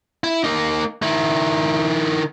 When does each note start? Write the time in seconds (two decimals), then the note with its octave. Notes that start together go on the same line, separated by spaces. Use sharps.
0.24 E4
0.44 A#3 D#4
1.02 D#3 E4